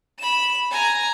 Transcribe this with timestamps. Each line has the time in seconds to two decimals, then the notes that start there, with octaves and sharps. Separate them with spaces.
0.19 B5 E7
0.71 G#5 A#5